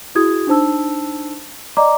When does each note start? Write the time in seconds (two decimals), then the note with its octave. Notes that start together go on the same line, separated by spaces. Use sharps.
0.15 E4 F#4 G#4 D#6 G#6
0.47 D4 D#4 C5 A5 E6
1.77 D5 D#5 A#5 D6